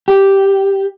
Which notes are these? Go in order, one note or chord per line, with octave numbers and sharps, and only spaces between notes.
G4